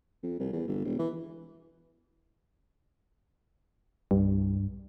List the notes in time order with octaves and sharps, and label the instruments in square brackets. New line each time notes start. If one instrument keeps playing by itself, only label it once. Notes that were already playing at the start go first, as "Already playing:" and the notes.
[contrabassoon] F2
C2
E2
G1
E1
E3
[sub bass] C2 [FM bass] G2